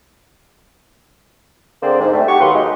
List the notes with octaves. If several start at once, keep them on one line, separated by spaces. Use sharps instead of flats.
D3 A#3 C4 G#4 C5 D5
G#2
G3 A3 C4
F#4 G4 C#6
D#2 F#3 B4 F5 F#5 C6
G#3 D#4 G4